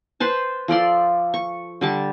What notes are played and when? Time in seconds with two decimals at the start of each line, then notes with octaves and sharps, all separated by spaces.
0.20 B4 C5 A5
0.68 F3 A4 D5 C6
1.34 C#6
1.81 D3 G3 A5